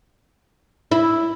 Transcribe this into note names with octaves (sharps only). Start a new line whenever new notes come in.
E4